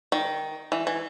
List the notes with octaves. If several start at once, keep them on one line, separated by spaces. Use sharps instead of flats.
D#3
E3
E3